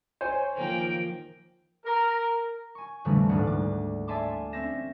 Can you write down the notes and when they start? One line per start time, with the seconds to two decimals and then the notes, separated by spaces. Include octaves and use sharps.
0.21 C5 C#5 G#5
0.56 D#3 F3 A#3 G5
1.85 A#4
2.75 G#5 C#6
3.05 F2 A#2 D3 E3 G3 A3
3.29 D#1 D2 G#2 F#5
3.47 D6
4.08 D5 E5 G#5 A5 C6 D6
4.53 C4 C#4 E5 A#6 E7